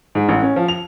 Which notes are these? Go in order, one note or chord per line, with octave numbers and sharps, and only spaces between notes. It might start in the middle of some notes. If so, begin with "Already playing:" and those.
G#2
A1
C#4
F3
F7